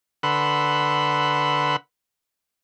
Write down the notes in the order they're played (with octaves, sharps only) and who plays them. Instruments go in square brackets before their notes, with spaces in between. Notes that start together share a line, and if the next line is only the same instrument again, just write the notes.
[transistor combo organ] D3 B4 F#5 B5 C6 E6